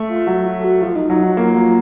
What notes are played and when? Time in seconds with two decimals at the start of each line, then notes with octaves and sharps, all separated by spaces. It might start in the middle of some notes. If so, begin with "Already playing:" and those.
Already playing: A3
0.09 F4
0.27 F#3 F#4
0.59 A4
0.64 F#4
0.82 F3 F4
0.96 D#4
1.10 F#3 D#4
1.23 F#4
1.37 A#3 F4
1.55 F#3 F4